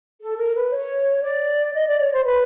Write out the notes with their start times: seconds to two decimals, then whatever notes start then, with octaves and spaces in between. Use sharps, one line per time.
0.21 A4
0.37 A#4
0.54 B4
0.66 C5
0.71 C#5
1.23 D5
1.74 D#5
1.88 D5
2.00 C#5
2.13 C5
2.25 B4